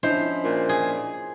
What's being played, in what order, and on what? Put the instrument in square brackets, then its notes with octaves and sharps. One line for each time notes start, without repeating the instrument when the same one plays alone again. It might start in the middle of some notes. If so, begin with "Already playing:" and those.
[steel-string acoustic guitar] F3 C#4 E4 [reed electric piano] D4 D#5 G6 [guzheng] C5
[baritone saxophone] A#2
[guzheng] G#4